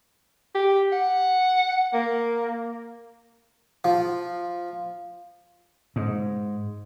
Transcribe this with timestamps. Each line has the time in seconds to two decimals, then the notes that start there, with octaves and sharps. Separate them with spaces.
0.55 G4
0.92 F#5
1.94 A#3
3.85 F3
5.96 G#2